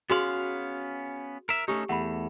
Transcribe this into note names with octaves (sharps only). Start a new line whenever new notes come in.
B3 C#4 F#4 G#4 F5 C6
A#4 E5
A3 C#4 D#4 G4
E2 A3 F#5 B5